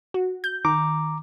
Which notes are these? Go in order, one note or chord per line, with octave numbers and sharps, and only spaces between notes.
F#4
G6
D#3 A#5 D6